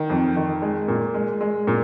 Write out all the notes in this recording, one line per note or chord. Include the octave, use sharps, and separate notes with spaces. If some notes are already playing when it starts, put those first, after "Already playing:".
Already playing: D#3
F2
D#3
G#3
A#2
G#3
G#3
A#2